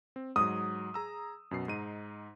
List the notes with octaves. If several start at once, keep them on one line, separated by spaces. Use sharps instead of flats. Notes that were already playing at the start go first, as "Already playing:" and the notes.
C4
G#2 F#3 D#6
G#4 A#5 E6
F#2 B2 C7
G#2 D#4 D#7